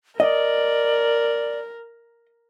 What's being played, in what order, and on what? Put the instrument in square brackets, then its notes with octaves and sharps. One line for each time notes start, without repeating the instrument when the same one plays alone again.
[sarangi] A#4 [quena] D5 [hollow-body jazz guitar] D#5